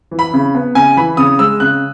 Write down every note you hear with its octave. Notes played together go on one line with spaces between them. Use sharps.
E3
B5
C#3
B3
C#3 G#5
E3 B5
C#3 D#6
G#3 E6
C#3 F#6